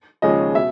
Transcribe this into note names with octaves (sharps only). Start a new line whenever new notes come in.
D#2 C#3 F3 G#3 C#4 D#5
B2 E5